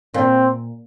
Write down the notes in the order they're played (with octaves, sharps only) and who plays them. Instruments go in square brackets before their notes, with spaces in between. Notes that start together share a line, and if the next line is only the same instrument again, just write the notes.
[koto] A#2 [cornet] C4